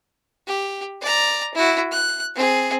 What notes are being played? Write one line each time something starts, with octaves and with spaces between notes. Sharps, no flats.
G4
D5 A#5
E4 F#4
F#6
C4 G#4